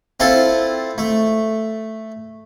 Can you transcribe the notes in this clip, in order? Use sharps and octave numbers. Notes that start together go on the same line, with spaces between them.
C4 E4 F4 A4 A5
A3